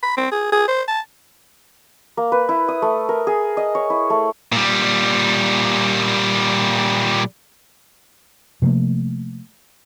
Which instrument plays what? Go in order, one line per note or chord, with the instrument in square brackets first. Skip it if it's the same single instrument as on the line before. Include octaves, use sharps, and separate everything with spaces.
[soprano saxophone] B5
C4
G#4
G#4
C5
A5
[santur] A#3
B4
E4
D#6
A3
A#4
G#4
D#5
C#5
E4
A3
[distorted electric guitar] A#2 G3
[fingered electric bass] C3 F3 A3 A#3